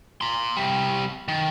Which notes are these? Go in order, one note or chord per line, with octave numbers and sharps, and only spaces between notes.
A#5 C6
C3 G3
D#3